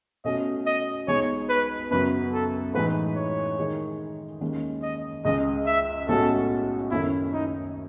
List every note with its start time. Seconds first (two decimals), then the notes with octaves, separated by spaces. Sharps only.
0.24 B2 A3 C#4 F#4 A4 D#5
0.66 D#5
1.08 B1 B2 G#3 D#4 G#4 C#5
1.50 B4
1.91 F#2 C#3 F#3 B3 B4
2.33 A4
2.74 A2 E3 G#3 D#4 B4
3.16 C#5
3.58 D#3 G#3 D#4 G#4
4.41 D#2 D#3 G#3 C#4
4.83 D#5
5.25 C#2 C#3 G#3 D#5
5.66 E5
6.08 B1 A2 G#3 C#4 F#4 A4
6.91 F#1 F#2 D#3 A3 C#4 E4
7.33 D#4